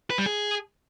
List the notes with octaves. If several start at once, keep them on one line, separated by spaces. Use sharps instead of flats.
B4
G3
G#4